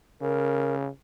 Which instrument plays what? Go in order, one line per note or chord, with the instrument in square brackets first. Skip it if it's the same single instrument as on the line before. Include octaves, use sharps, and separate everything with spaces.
[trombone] C#3 [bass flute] A#4